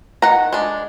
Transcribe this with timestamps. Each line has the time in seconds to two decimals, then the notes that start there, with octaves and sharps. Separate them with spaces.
0.22 D#3 F#5 A#5
0.53 G#3 D4